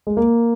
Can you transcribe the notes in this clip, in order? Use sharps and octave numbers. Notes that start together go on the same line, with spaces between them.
G#3
A#3